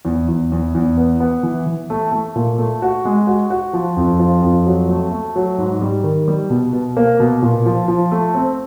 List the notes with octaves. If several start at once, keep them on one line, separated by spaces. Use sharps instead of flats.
E2
E2
E2
E2
B3
B3
E3
E3
A3
A3
A#2
A3
F#4
G#3
F#4
F#4
F3
F2
F3
F2
F#3
A3
A3
F#3
G#2
G3
D#3
G3
B2
B2
A#3
B2
A#2
F3
F3
A3
C4